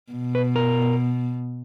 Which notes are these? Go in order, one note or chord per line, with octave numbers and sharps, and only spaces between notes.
B2
B4
A#4